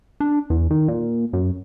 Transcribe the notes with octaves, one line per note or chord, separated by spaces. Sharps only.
D4
E2
D#3
A#2
F#2